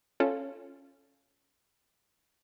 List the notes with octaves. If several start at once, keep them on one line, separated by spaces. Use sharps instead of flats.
C#4 F4 A4